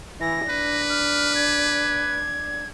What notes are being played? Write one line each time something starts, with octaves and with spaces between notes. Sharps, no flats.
E3 A#6
D4 B4
F6
G#6